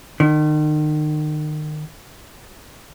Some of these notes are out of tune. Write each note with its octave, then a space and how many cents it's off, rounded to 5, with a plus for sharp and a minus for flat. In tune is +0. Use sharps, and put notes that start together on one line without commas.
D#3 -35